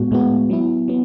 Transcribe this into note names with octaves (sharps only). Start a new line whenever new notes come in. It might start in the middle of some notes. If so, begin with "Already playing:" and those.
Already playing: A2 G#3 B3 F#4
A2 G#3 B3 F#4
F#3 B3 E4
F#3 B3